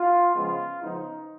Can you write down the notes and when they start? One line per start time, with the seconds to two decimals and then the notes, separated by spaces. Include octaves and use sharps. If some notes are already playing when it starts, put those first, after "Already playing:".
Already playing: F4
0.34 C#2 C#3 F3 G#3 B3 F4
0.82 C#2 C#3 F3 B3 D#4